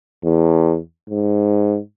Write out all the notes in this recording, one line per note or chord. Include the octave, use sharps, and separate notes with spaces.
E2
G#2